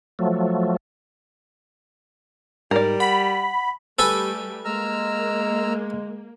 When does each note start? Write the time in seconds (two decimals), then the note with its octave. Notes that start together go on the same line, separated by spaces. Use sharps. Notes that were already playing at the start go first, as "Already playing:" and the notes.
0.19 F3 F#3 A3
2.71 G#2 G3 D#4 A#4 D5
3.00 F#5 B5
3.99 G3 A3 A4 B4 G#5
4.65 G#3 A#3 A#5 E6 F6